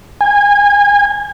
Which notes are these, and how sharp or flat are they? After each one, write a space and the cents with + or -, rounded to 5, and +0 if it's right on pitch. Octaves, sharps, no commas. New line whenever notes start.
G#5 -25